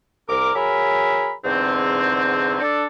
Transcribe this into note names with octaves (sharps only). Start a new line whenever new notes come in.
C2 A#4 D6
F#3 G#4 A#4 E5 B5
E2 G#2 D3 F#3 C4
D4 A4